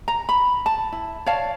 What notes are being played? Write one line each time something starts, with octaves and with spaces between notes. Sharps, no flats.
A#5
B5
A5
E4
C#5 D5 F5 A5